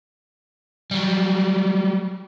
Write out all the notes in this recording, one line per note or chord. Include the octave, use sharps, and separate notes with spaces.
F#3 G3